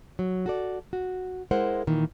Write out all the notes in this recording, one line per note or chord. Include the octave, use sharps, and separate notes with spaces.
F#3
F#4 A4 D5
F#4
G#3 E4 A#4 C5 F#5
A#2 D#3 E3